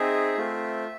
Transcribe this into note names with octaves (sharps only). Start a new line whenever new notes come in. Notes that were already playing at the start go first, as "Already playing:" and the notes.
Already playing: C4 D#4 G#4 E5
A3 C4 F4